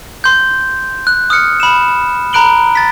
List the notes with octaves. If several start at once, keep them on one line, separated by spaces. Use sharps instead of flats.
C6 G6
F#6
D#6 F6 F#6 C#7
B5 E7
A#5 B5 F#6 D7 F#7 G7
A6 B6